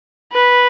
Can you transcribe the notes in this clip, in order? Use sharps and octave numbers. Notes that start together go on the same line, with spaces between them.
B4